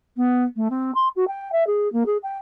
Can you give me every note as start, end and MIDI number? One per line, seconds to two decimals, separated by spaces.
0.17 0.44 59
0.56 0.68 57
0.70 0.91 60
0.95 1.08 84
1.16 1.27 66
1.28 1.52 79
1.52 1.66 76
1.67 1.91 68
1.93 2.04 58
2.06 2.18 68
2.23 2.38 79